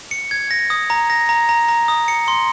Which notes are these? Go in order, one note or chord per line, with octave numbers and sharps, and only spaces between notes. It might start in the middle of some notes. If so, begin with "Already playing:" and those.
C#7
G#6
A#6
D#6
A#5
A#6
A#5
A#5
A#5
D#6
C#7
C6